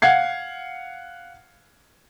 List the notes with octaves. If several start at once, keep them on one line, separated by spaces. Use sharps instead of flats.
F5 F#5 G#6 C7